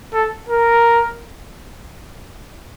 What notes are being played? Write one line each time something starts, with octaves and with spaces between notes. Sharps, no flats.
A4
A#4